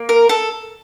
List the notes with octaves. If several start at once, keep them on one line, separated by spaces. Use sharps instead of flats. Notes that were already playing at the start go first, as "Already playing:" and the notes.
Already playing: A#3
A#4
A4